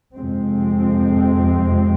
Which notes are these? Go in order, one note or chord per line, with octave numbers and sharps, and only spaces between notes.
F2 C3 G#3 C4